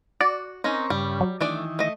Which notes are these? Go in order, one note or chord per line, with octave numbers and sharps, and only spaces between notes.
F#4 D5
C4 C#4 D#4 A#4 C#6
G2 C#3 G3
F#3
D#3 E3 A3 D4 D5
A3 D#5